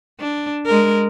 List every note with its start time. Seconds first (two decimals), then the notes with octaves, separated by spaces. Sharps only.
0.21 D4
0.66 G#3 A#4